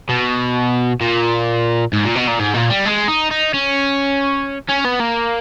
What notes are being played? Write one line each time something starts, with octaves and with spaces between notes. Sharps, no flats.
B2
A#2
G#2
A#2
B2
A#2
G#2
A#2
G3
G#3
D#4
D#4
C#4
C#4
B3
A#3